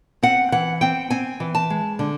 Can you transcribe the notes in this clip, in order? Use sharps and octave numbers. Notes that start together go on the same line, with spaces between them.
C4 F#5
E3 F#5
C4 G5
C4 G#5
E3
A5
G#3
D3